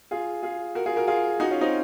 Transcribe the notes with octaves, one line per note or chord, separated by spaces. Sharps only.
F4 G#4
F4 G#4
F#4 A#4
F4 G#4
F#4 A#4
F4 G#4
D#4 F#4
C#4 F4
C4 D#4